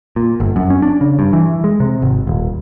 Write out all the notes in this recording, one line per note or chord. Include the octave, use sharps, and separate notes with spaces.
A#2
G1
F#2
C#4
D4
C#3
G2
E3
G#3
C3
G#1
D#1